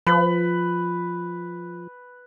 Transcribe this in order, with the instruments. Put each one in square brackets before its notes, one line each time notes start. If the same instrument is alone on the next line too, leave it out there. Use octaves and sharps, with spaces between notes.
[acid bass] F3 [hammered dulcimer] B4